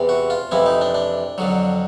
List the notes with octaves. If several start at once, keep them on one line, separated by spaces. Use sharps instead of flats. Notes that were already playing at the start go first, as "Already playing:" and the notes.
Already playing: E2 C3 E3
F#4
F4
F2 C3 E3 E4
D#4
D4
D4
F2 D3 F#3